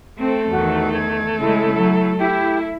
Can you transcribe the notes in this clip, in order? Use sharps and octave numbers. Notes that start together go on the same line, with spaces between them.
A3 C4 A4
E2 D#3 F#4
G#6
C#3 G#3 E4
F#3
E4 G4